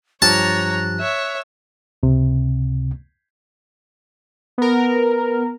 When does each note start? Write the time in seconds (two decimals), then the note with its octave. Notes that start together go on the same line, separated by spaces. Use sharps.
0.22 G2 F3 G4 C#5 A5 A#5 F#6
1.00 C#5 E5
2.03 C#2 C3
4.58 B3 A#4